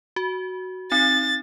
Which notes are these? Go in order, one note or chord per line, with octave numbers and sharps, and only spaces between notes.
F#4
C4 D#4 A6